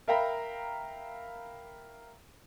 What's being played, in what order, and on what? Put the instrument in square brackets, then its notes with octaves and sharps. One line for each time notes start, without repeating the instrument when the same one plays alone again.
[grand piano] A#4 E5 F5 G5 A#5 B5